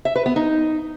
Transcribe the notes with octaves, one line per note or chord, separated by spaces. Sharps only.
E5
B4
B3
D#4